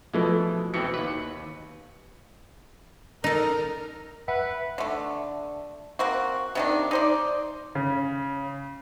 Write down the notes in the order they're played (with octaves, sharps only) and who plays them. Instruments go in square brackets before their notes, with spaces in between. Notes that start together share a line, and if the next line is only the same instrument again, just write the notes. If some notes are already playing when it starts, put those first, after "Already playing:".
[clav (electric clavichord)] B2 E3 G#3 [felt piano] F3 A3
[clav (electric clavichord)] B2 E3 C4 [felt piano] C#7
[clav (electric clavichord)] D#2 B4
[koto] D#4 A4 [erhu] A#4
[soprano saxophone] B4 [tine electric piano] E5 F#5
[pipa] D3 A3
A#3 C4 F#4
C3 D#3 D4
D#4 C5 D5
[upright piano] C#3